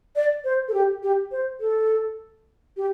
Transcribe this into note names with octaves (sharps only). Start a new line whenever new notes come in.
D5
C5
A4
G4
G4
C5
A4
G4